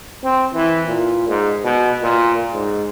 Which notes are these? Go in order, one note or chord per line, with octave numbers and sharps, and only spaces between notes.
C4
E3
A#2
G#2
B2
A#2
G#2